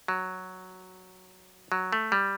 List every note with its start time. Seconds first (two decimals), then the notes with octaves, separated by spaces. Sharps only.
0.08 F#3
1.72 F#3
1.93 A3
2.12 G3